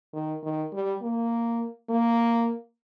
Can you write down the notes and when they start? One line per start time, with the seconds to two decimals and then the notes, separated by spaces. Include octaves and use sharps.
0.14 D#3
0.43 D#3
0.73 G3
1.02 A#3
1.90 A#3